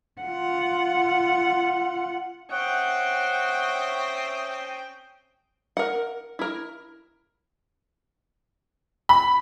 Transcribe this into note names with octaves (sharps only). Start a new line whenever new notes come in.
F4 F#5
C4 C#4 C#5 E5 F#5 G5 D#6
A#4 F#5
E4 A#4
B5